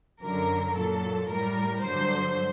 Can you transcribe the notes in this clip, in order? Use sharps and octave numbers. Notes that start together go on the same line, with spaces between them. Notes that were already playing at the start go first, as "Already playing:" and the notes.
F#2 D3 F#3 A#4
A#2 F#3 A4
A2 G3 A#4
G2 D3 F#3 C5